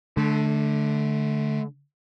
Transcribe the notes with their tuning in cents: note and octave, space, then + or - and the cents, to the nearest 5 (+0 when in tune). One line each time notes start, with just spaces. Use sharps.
D3 +0 A3 -30